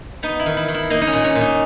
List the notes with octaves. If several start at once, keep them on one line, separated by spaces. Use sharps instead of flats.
B3 D#4
E4
D#3
E4
D#3
E4
A#3 D#4
D#4
C#4
A#2
C#4
A#2
D#4